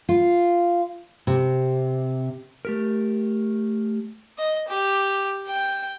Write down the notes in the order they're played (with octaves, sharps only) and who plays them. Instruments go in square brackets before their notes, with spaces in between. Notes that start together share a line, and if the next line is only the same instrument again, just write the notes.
[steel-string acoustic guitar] F4
C3
[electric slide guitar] A3 G4 A#4
[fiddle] D#5
G4
G5